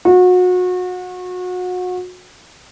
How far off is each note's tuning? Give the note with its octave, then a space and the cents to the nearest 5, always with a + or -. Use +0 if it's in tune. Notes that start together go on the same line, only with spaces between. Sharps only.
F#4 -30